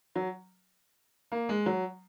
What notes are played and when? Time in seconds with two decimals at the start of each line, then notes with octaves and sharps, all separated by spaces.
0.15 F#3
1.32 A#3
1.49 G#3
1.66 F#3